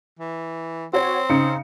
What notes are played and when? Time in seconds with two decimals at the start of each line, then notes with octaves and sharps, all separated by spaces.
0.19 E3
0.93 C4 F#4 C#5
1.29 C#3 D#4 C#7